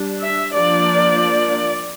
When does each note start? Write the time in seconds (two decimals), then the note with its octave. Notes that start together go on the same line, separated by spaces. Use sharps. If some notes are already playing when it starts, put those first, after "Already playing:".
Already playing: G3 D4
0.20 E5
0.52 F3 A#3 D4 D5